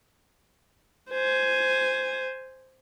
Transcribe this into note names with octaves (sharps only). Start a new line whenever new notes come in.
C5 G#5